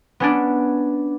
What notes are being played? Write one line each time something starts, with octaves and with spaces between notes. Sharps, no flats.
B3 C#4 D4